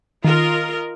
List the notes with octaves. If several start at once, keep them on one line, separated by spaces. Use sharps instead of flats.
D#3 F4 A#4 D#5